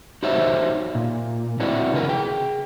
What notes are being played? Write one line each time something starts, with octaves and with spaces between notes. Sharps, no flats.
D#4 F#4 G4 C5 C#5 E5
A#2
C4 D4 E4 F#4 B4 E5
C#3 F4 F#4 G#4 A#4 B4
G#4 G5